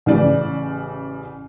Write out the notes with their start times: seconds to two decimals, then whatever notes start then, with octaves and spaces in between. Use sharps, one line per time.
0.06 A1 C#3 D5